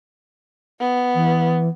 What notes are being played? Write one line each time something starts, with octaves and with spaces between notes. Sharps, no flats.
B3
E3